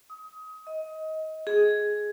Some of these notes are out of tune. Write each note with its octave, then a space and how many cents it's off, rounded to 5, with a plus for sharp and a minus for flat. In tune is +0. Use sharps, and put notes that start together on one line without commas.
D#6 +25
D#5 +20
G#4 +10